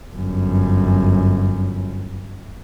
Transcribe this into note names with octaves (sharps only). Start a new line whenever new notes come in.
G1 F#2